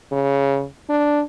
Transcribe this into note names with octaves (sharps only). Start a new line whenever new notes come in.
C#3
D4